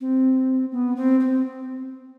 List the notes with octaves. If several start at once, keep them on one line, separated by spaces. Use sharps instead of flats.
C4
B3
C4
C4